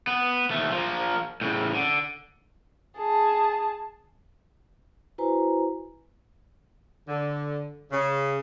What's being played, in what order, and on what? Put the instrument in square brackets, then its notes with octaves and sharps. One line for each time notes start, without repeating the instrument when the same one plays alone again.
[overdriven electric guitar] B3
D#2 A3
F3 A#3
A2 C#3
D3
[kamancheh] G#4 A5
[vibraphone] E4 F#4 B4 C5 G#5 A#5
[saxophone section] D3
C#3